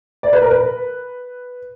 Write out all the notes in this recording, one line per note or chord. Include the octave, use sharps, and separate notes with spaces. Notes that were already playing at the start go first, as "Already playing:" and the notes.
D5
B4
A#4
B4